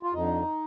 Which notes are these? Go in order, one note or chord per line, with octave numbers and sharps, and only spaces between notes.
F4
F2 D3 D#4